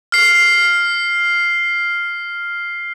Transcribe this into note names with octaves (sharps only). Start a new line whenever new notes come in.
F6 C7